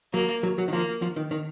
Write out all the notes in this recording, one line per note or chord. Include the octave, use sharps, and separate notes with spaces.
F#3 A#3
F#3
F#3
D#3
F3 A#3
F3
D#3
D#3